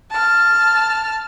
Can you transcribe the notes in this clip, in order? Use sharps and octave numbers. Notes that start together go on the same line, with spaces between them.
A5 F6